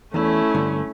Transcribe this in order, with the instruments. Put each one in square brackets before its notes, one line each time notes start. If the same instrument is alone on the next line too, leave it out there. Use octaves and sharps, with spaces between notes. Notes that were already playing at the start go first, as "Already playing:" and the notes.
[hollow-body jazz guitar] E2 [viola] A3 C#4 [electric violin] E4
[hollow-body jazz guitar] G2 D3